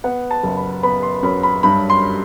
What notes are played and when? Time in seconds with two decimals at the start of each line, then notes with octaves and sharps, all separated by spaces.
0.04 B3 F#5
0.31 A5
0.43 F#1
0.57 B5
0.83 B3 B5
1.03 C6
1.23 F#2 B5
1.43 B5
1.63 G2 B5
1.90 C6